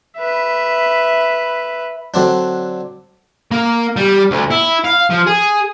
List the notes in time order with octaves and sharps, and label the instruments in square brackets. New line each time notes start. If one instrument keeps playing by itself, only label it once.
[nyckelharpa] B4 E5
[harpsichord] D3 F#3 C4 D4
[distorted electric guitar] A#3
G3
D2
E4
F5
F3
G#4